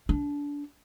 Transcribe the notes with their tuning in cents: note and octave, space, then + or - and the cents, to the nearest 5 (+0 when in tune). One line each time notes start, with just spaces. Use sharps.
D4 -25